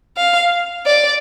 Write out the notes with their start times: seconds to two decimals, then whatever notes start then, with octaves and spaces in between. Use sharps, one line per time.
0.17 F5
0.86 D5